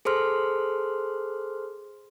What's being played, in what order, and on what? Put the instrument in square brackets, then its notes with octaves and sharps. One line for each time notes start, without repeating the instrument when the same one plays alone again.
[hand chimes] G#4 A4 C5 C6 F6